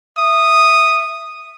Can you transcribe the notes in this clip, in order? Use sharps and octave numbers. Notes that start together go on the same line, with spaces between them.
E5 D#6